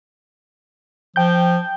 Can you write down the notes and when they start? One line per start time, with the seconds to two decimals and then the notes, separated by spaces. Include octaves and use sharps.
1.16 F3 G5 G6